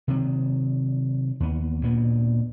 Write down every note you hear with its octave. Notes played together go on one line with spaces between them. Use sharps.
C3 D#3 F#3
D#2 B3
D2 A#2 B3